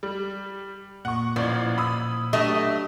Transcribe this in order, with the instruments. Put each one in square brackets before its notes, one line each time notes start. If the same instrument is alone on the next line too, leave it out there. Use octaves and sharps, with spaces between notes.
[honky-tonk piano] G3
[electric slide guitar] A#2 [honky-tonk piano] F#5 C#6
[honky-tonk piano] A1 D5 [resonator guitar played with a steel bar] F3
[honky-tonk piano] B5 D#6 E6
[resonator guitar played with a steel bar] F#3 A3 D#5 [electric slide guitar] D4 G4